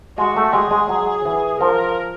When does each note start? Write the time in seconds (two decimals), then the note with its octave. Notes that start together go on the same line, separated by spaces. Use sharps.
0.18 G#3 F#4
0.36 A3
0.53 G#3 G#4
0.71 G#3
0.89 F#3
1.25 E3
1.60 F3 A#4